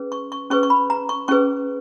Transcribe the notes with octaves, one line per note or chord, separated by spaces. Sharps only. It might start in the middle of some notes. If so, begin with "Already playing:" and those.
Already playing: C#4 G#4 B4
C#6
C#6
C#4 G#4 B4 C#6
C#6
B5
A#5
C#6
C#4 G#4 B4 C#6